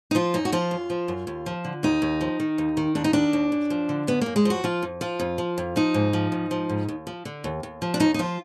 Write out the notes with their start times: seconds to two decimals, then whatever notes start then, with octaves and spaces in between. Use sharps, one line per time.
0.11 D#4
0.15 F3 F4
0.34 F#2 D#4
0.45 F#4
0.52 F3 F4
0.71 F#2
0.90 F3
1.08 F#2
1.27 D#2
1.46 F3
1.65 D3
1.83 D#2 D#4
2.02 D#2
2.21 F3
2.40 D#3
2.58 D#2
2.77 D#3
2.95 D#2 D4
3.04 D#4
3.13 D#3 D4
3.33 D#2
3.52 F#2
3.70 F3
3.89 D3
4.07 F#2 B3
4.21 F#2 A#3
4.36 G#3
4.45 F3 F#4
4.64 F3 F4
4.82 F2
5.01 F3 F4
5.20 F2
5.38 F3
5.58 F2
5.76 F3 D#4
5.94 G#2
6.13 F3
6.32 G#2
6.51 F3
6.69 G#2
6.88 D#2
7.07 F3
7.25 D3
7.44 D#2
7.63 D#2
7.82 F3
7.94 D4
8.00 D#2 D#4
8.14 D#4
8.19 F3 F4